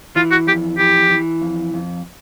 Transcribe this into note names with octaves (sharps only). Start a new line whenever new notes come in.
E3 F4
F#4
F2 G4
E3 G4
E3
F2
F2